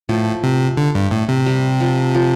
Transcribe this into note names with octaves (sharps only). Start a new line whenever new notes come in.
A2 F3
C3
D3
G2
A2
C3
G3
F3
F3